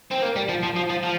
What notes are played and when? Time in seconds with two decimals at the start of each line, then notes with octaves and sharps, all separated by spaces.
0.11 C4
0.22 A#3
0.36 G3
0.49 F3
0.63 F3
0.76 F3
0.90 F3
1.03 F3